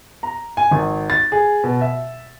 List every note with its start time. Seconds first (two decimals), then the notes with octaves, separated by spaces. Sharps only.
0.23 A#5
0.57 G#5
0.71 G#1
1.10 A6
1.32 G#4
1.64 B2
1.81 E5